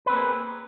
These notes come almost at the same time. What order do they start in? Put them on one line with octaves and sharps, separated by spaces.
B4 C4 A#3 G#4